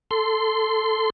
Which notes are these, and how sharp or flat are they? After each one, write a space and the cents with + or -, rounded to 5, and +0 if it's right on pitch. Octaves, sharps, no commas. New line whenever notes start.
A4 +0 C6 -15